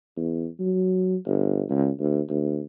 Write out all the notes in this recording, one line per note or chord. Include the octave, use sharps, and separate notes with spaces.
E2
F#3
G1
C#2
D2
D2